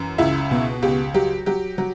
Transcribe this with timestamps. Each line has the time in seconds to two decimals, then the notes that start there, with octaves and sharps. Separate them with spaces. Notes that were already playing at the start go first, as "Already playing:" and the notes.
Already playing: F#2 E3
0.18 C#2 E4
0.51 B2
0.82 C#2 G4
1.14 F#3 G4
1.46 F#3 G4
1.78 F#3